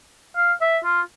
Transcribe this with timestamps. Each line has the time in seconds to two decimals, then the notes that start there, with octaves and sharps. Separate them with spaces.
0.36 F5
0.61 E5
0.84 F4